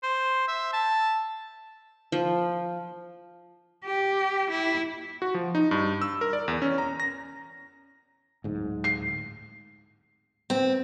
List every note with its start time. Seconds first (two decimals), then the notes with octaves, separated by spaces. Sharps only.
0.03 C5
0.48 E5
0.73 A5
2.12 F3
3.85 G4
4.51 E4
5.22 F#4
5.34 F3
5.55 D#4
5.71 G2
6.02 E6
6.21 A#4
6.33 D5
6.48 E2
6.62 C#4
6.78 A#5
7.00 A#6
8.44 D1 G#2
8.84 C7
10.50 C4